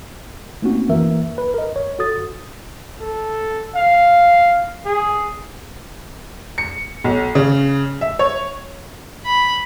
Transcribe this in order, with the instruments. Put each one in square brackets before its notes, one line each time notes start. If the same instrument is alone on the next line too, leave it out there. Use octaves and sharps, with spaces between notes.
[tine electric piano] A3 A#3 C4 C#4 D#4 F#4
E3 A#3 A#4 E5
B4
A#4 D#5
C#5
F#4 A4 D#6 A6
[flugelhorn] A4
F5
G#4
[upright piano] C#7
B1
C#3
E5
C#5
[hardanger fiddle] B5